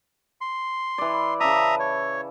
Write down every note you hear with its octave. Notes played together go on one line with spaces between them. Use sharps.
C6
E3 D5
C#3 E5 A5 A#5 D#6
C#5